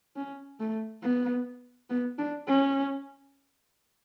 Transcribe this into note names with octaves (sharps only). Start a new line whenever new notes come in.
C#4
A3
B3
B3
D4
C#4